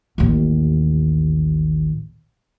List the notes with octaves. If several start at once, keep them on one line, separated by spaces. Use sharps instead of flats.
A1 D#2